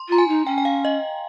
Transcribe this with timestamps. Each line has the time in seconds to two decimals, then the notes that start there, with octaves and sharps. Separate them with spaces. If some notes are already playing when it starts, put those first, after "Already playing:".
Already playing: C6
0.09 F4 A#5
0.18 G#5
0.28 D#4
0.46 C#4 G5
0.58 G5
0.65 F5
0.85 D#5